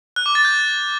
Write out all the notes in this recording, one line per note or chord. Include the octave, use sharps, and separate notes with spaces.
F#6
D6
A6
G6